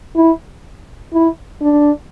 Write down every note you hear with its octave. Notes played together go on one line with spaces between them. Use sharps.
E4
E4
D4